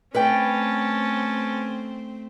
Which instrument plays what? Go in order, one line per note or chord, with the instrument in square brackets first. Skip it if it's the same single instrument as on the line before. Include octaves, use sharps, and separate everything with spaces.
[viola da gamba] A3 C4 [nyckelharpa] C#4 A5 [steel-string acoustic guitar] B4 D5 G5